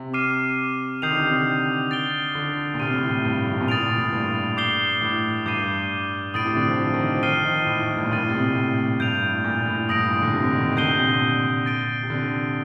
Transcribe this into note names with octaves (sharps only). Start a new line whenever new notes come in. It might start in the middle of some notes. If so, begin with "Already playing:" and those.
Already playing: C3
D6 F6 C7 D#7
D#3 D#6 G6 C7 F7
D3
C3
D3
A6 D7 G7
D3
A#2
C3 F6 C7 D#7
A2
A2
G2
D3
C3
A#2
A2 D#6 A6 D7 F7
A#2
A2
G2
D6 G6 C7 G7
A2
G2 D6 G6 C7 D#7
A2 D#6 A6 D7
C3
D3
F3
F3
D#3
F3
D#3 F6 C7 D#7 G7
F3
D#3
A2
A2
G2
A#2
A2 D#6 A6 D#7
C3
A#2
A2
G2 G6 D7 F7
A2
A#2
A2
G2 D#6 A#6 D7
A2
A#2
D3
C3
D3
D#3
D3
D#3
D3 G6 C7 D#7 G7
C3
A#2
A#2
A6 D7 G7
C3
D3